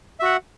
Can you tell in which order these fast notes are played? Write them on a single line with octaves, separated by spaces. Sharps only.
E5 F#4 F#5